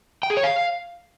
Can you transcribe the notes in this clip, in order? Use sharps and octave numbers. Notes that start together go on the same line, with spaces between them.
G5
G#4
C#5
F5